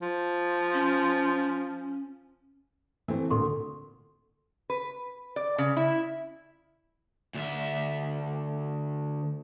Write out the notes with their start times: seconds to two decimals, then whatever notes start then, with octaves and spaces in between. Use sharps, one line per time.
0.02 F3
0.73 C#4
3.08 E3 A3 C4
3.30 D2 A#2 D3 A4 C6 C#6
4.70 B4
5.36 D5
5.58 C#3
5.77 E4
7.34 D2 E5